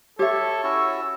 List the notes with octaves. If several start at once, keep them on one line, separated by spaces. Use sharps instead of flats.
G4 A4 C#5 E5
C#4 E4 F#4 E6